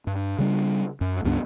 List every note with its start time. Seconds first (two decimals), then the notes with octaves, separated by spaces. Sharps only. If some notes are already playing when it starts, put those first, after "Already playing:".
0.07 G2
0.38 C#3 G3 D4
1.01 F#2
1.24 C#2 G2 B3 D4